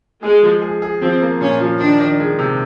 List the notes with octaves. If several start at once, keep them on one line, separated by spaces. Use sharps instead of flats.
G#3 G#4
F3
G#4
G#4
F3 C4
A#3
A#2 C#4
F3
D#3 D4
D#3
G#3
C3